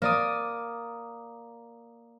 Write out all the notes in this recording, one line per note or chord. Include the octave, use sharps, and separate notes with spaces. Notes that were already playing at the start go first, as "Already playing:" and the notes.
A#3 D5 D#6